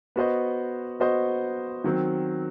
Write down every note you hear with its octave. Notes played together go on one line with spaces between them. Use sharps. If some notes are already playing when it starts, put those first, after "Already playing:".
B3 F#4 C5 D#5
B3 F#4 C5 D#5
D#3 F#3 C4